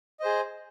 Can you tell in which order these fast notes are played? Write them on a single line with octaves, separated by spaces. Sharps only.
D#5 C5 G#4